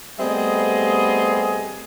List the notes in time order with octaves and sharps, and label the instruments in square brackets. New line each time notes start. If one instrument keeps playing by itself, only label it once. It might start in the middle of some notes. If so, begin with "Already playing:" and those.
[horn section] G3 A3 B3 C4 G#4 D#5